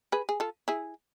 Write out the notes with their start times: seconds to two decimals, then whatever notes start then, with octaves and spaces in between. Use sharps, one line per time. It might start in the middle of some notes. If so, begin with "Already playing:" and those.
0.12 G#4 B4
0.29 G#4
0.40 F4 A4
0.68 E4 G#4